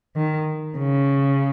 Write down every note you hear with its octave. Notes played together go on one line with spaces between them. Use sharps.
D#3
C#3